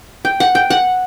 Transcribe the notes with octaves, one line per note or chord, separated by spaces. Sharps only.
G5
F#5
G5
F#5